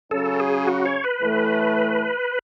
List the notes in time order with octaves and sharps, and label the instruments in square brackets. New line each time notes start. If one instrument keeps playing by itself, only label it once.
[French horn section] C#3 F#3 C#4 [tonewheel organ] A4
[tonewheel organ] G#4
F#4
C#5
B4
[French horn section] A2 E3 A3